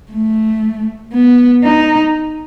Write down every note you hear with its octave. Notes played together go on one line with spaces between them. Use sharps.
A3
B3
D#4